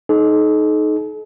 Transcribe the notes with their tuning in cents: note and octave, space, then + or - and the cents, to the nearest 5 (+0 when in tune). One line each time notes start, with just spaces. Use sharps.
D#4 +0 A4 -45